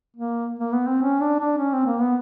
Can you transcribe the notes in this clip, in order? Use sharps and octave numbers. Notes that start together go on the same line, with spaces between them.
A#3
A#3
B3
C4
C#4
D4
D4
C#4
C4
A#3
B3